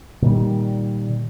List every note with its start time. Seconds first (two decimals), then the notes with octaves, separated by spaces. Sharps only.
0.22 A#2 D#3 G3